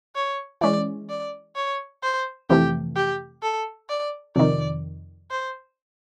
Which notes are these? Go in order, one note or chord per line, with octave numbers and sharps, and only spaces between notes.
C#5
E3 G#3 C#4 D5
D5
C#5
C5
F2 C3 E3 A3 G4
G4
A4
D5
F2 C3 D#3 D5
C5